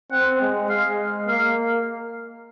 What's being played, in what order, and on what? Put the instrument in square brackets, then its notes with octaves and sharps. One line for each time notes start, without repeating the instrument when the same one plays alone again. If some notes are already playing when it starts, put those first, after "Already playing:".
[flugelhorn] C4 [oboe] F#5
[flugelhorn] G#3
[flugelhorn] G#3 [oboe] F5
[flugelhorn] A#3 [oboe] F5